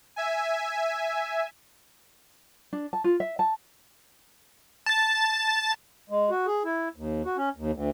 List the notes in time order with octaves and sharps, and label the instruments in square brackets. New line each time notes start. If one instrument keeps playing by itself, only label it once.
[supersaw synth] E5 G#5
[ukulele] D4
A5
F4
E5
A5
[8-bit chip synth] A5 A6
[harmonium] G#3
F#4
G#4
E4
D#2
F#4
C#4
D#2
D2